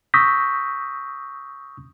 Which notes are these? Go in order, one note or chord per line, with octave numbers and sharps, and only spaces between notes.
C#6 D#6 E6 G6 A#6 B6